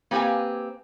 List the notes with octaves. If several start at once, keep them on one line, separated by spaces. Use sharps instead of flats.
A#3 C4 G4 B4 F5 G#5